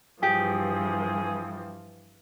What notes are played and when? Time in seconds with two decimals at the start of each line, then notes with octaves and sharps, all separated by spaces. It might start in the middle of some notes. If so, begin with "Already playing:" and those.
0.23 G2 E3 F3 G4 G#4